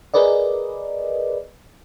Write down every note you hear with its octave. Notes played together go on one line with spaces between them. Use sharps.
G#4 A#4 B4 D5 D#5